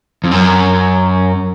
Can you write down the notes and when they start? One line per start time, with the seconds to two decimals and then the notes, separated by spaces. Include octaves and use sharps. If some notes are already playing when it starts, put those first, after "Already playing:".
0.24 F2
0.31 F#2